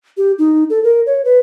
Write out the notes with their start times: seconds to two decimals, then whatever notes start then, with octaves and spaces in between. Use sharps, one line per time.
0.17 G4
0.39 D#4
0.70 A4
0.84 A#4
1.06 C#5
1.25 B4